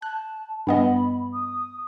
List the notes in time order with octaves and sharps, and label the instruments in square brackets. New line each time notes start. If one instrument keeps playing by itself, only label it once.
[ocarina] A5 [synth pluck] F#6
[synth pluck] G2 B3 D#5 [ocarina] B5
[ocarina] D#6